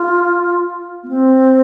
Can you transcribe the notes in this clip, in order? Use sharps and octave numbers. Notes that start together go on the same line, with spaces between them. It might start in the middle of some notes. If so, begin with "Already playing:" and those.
Already playing: F4
B3
C4